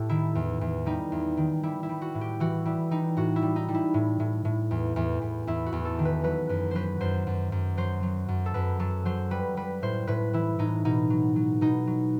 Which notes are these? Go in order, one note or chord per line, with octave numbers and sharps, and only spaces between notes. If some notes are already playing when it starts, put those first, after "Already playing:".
Already playing: A2 G4 A4
D#3 E4
E2
E2
G3 D#4
E2
D#3
G3 E4
E4
G3
F#4
A2
G4
E3 F#4
G3 E4
G3 D#4
A2 F#4
E4
G3
D#4
G3
E4
A2
A2
A2
E2
E2
E2
E2 E4
F#4
E2
A4
D#3
B4
F#3 B4
F#2 B4
F#3 B4 C5
F#2 C5
F#2
F#2
F#3 C5
F#3
F#2
A4
F#2 B4
F#3 A4
F#3 C5
G3 B4
G3 B4
A2 C5
A2 B4
E3 E4
A2 D#4
B2 D#4
F#3
F#3
B2 D#4
F#3